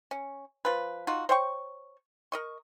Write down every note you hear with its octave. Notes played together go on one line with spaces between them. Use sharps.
C#4
F3 B4
D#4 F4 F#4
C5 C#5 G5 C#6
A#4 D#5 C#6